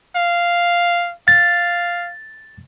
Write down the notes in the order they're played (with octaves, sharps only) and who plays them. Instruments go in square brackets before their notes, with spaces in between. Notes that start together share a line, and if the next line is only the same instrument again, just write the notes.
[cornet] F5
[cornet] F5 [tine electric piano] A6